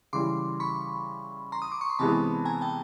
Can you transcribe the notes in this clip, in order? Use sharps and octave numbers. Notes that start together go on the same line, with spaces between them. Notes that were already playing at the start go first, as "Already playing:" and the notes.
C#3 E3 G3 C6 D6
B5 C#6
A#5 C6
D#6
D6
C#6
C6
C3 E3 G#3 B3 A5 B5
G#5 A#5
G5 A5